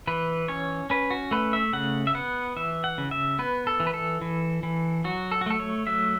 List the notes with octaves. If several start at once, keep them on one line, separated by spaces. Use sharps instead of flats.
E3 B4
C#4 C#5
C#4 B4
F#4
A3 B4
E5
C#3 F#5
E5
B3 F#5
E3 E5
F#5
C#3
E5
B3 B4
A4
E3
B4
A4
E3
E3
F#3 F#4
A4
F#4
A3 A4
C#5
F#3 E5